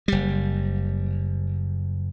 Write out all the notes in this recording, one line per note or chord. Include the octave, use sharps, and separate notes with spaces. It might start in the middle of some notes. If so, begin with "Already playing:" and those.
F#1 G3